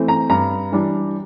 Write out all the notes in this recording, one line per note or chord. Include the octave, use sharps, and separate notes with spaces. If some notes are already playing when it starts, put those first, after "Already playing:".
Already playing: E3 A3 C4
A#5
G2 A#5
E3 G3 D4